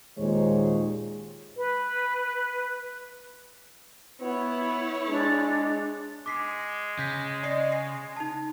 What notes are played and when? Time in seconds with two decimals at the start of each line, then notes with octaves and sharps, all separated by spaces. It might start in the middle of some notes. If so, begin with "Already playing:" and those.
0.18 D#2 A#2 D#3 G#3 C5 C#5
1.57 B4
4.21 B3 E4 C#5
5.08 G#3 D4
6.26 G#3 D6 B6 C7
6.99 C#3 G6 B6
7.43 D5 D#5 C7
7.72 C7
8.16 D#4 A5